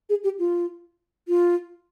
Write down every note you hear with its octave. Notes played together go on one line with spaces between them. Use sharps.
G#4
G4
F4
F4